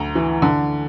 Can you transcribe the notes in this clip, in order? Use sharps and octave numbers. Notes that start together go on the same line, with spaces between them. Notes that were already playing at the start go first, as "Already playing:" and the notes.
Already playing: D2 A#5
E3
D3